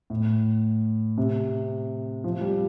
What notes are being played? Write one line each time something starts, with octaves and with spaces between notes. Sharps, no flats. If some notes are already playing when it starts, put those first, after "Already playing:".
A2
C3
F3
G3